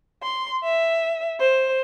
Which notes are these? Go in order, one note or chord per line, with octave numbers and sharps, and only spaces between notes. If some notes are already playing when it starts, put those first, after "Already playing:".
C6
E5
C5